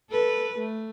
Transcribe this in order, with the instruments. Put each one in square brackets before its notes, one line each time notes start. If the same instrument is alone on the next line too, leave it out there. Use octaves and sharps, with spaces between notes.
[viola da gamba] A4 B4
A3